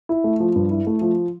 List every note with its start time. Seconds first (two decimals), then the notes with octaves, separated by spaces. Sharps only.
0.09 E4
0.24 A3
0.40 F3
0.56 G2
0.71 E4
0.87 A3
1.01 F3